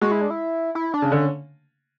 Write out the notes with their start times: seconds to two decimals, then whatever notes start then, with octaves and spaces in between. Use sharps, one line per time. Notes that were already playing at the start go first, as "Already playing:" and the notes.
0.01 G#3 F#4
0.12 E4
0.21 D4
0.30 E4
0.75 E4
0.94 D4
1.02 C#3
1.12 D3 C#4